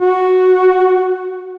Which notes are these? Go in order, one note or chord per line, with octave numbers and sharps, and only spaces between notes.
F#4